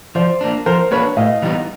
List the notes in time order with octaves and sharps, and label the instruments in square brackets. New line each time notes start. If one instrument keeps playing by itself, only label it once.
[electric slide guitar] F3 [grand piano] C5 D5
[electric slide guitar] A#3 D4
[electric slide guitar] F3 [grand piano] A#4 C5
[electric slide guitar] A#3 D4 [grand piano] B4 C#5
[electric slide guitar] A2 [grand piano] D#5 F5
[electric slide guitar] E3 G3 B3 D#4